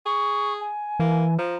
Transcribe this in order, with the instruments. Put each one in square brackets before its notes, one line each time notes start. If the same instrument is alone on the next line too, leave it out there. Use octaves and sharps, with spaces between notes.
[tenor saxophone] G#4 [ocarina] C#6
[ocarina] G#5
[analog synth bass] E3 [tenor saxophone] A#3
[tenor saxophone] F3 [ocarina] A#5